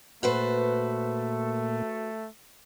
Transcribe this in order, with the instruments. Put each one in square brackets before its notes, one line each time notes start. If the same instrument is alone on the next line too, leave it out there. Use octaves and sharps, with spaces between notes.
[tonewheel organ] A#2 A#3 [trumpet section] A3 [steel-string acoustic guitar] F#4 B4 C5